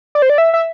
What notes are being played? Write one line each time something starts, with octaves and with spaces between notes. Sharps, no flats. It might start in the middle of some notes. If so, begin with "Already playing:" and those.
D5
C5
D5
E5
E5